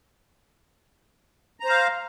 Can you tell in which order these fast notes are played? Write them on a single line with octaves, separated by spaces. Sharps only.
A#5 C5 F5